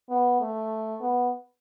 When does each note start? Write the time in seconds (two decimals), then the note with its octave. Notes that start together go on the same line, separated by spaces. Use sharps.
0.10 B3
0.41 A3
1.01 B3